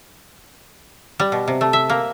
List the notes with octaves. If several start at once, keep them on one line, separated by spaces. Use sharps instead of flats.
G3
B2
C3
A3
E5
A#3